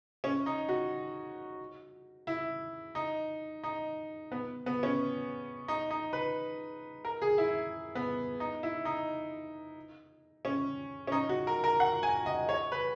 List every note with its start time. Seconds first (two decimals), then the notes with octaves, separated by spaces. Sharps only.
0.24 C#4
0.46 D#4
0.69 F#4
2.27 E4
2.95 D#4
3.63 D#4
4.32 B3
4.66 B3
4.83 C#4
5.68 D#4
5.90 D#4
6.13 B4
7.05 A#4
7.22 G#4
7.38 E4
7.95 B3
8.40 D#4
8.63 E4
8.85 D#4
10.45 C#4
11.07 C#4
11.12 D#4
11.29 F#4
11.47 A#4
11.64 A#4
11.80 F#5
12.03 G#5
12.26 D#5
12.49 C#5
12.72 B4